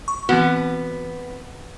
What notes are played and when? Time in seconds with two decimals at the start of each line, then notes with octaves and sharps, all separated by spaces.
0.08 C#6
0.29 E3 B3 C4 F#4